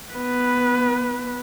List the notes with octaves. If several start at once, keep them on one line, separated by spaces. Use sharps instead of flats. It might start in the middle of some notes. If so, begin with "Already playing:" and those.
B3 B4